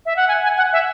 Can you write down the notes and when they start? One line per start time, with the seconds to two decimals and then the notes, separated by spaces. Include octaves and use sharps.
0.06 E5
0.16 F#5
0.28 G#5
0.43 G#5
0.57 F#5
0.72 E5